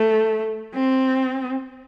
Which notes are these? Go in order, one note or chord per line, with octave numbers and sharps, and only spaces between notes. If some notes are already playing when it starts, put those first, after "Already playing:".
Already playing: A3
C4